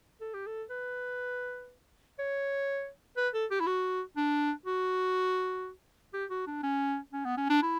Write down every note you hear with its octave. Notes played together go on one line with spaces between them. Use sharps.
A4
G4
A4
B4
C#5
B4
A4
G4
E4
F#4
D4
F#4
G4
F#4
D4
C#4
C#4
B3
C#4
D4
E4